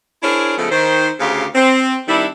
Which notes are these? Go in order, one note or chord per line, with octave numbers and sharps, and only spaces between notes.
D4 E4 G#4 A#4 C5 C#5
C#3 F3 G#3 A3 B3 A4
D#3 C5
D2 C#3 G4 F5
C4
D#3 G3 D4 E4